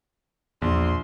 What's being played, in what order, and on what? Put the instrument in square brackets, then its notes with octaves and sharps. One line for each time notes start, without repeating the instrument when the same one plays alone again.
[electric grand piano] A#1 [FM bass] E2 [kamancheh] C6